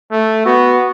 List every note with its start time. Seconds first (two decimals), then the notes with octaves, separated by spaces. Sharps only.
0.11 A3
0.46 B3 F#4